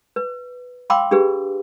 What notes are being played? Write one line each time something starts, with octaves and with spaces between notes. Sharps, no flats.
B4
F5 G5 B5 C6 D6 E6
D4 G4 G#4 B4